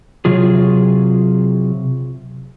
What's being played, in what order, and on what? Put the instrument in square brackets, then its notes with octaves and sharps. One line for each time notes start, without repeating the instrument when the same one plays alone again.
[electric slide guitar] C3 F#3 F4 G#4